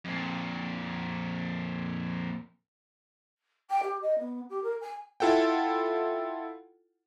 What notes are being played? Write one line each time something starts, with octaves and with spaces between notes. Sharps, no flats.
F2 A#2
G5
G4
D#5
B3
G4
A#4
G#5
E4 F4 A4 F#5 G5